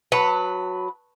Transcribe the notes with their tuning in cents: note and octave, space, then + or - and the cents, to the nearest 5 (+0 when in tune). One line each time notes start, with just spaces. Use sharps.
F#3 -10 B4 +0 A5 +30